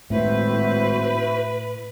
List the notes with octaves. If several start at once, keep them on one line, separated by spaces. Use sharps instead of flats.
G#1 A2 F#4 B4 C5 E5